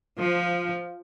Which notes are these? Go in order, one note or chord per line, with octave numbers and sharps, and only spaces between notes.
F3